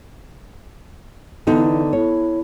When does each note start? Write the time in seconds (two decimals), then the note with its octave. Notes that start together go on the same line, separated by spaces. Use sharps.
1.47 D3 E3 B3 D#4
1.93 E4 C#5